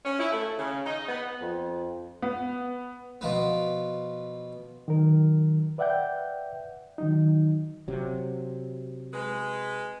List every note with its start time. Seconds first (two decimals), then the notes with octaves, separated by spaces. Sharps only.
0.05 C#4
0.19 E4
0.32 A3
0.59 C#3
0.86 D#4
1.09 B3
1.41 F2
2.22 B3
3.21 B2 F3 B3
4.88 D#3 F#3 A#4
5.78 B4 D5 E5 F#5 G5 G6
6.98 D#3 F#3 D#4
7.88 C3 F#3
9.13 G#3 B4